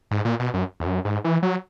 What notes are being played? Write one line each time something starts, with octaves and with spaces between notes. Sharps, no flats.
G#2
A#2
B2
F#2
E2
F#2
G#2
E3
F#3